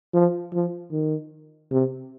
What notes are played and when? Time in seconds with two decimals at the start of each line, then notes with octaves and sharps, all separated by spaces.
0.14 F3
0.53 F3
0.92 D#3
1.71 C3